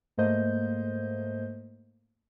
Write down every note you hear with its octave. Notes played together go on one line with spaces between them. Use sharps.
G#2 A3 A#3 C5 D#5 G6